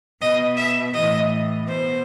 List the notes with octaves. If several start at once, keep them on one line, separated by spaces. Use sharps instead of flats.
B2 D#5
E5
A2 E3 D#5
B2 C5